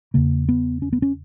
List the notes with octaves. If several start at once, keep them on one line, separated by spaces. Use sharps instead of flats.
E2 C#3 A#3
B3
C#4
B3
C#4